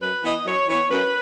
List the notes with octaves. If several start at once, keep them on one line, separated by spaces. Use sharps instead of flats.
F#2 B4
E3 B3 D#5
F#2 C#5
E3 B3 C#5
F#2 B4